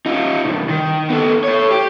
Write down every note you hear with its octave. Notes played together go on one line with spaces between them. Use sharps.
D#4 F4
C2 G2
D#3
B3 A4
A4 C#5
G4